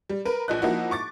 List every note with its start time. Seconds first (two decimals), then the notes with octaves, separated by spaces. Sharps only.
0.09 G3
0.25 A#4 B4
0.48 A#1 F3 D#5 F#6
0.62 F3 A#3 D#4 E4 F#4
0.91 C#6 D6 A6